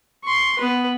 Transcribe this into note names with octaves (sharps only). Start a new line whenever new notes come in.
C6 C#6
B3 B4